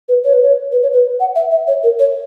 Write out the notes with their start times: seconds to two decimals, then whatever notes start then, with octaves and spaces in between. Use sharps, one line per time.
0.08 B4
0.24 C#5
0.33 B4
0.42 C#5
0.72 B4
0.82 C#5
0.93 B4
1.20 F#5
1.35 E5
1.51 E5
1.67 C#5
1.83 A#4
1.99 C#5